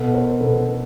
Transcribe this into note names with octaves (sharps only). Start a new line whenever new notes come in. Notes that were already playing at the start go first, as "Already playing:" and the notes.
Already playing: B2 A4 B4
A#4 C5
B2 A4 B4